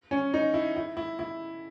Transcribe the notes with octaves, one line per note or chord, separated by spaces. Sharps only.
C#4
D#4
E4
E4
E4
E4